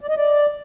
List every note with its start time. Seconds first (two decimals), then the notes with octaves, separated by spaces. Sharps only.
0.01 D5
0.09 D#5
0.17 D5